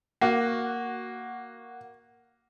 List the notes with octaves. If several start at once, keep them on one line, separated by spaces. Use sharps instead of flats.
A#3 F#4